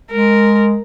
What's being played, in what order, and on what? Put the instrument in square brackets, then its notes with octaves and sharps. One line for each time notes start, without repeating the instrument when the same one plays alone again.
[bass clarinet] G#3 [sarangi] A#4